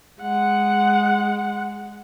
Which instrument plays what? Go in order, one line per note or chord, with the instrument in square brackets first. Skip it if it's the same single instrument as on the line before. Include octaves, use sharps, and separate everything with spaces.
[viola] G#3 F#5